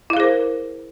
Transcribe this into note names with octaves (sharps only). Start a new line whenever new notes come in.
E4 G#4 A#4 C5 F5